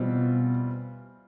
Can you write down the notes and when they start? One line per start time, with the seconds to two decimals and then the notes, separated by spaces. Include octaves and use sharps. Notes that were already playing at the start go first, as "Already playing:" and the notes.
Already playing: B2 E3 G3 C4 F4